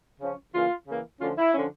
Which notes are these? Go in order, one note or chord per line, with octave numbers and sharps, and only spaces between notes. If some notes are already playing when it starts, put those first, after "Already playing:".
C#3 F3 C#4
C#3 E3 A#3 F4
C#3 E3 A#3
D2 D3 F3 C#4 F4
E4
D3 F3 C#4